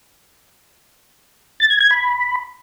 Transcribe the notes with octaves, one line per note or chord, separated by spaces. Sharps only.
A6
G#6
G#6
B5